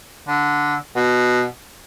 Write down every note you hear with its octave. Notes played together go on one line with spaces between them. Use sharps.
D3
B2